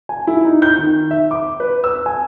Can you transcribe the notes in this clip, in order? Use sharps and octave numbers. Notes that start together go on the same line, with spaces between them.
G#5
E4
D#4
G6
D#3
E5
D6
B4
E6
G#5